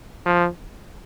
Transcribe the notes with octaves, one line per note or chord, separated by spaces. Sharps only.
F3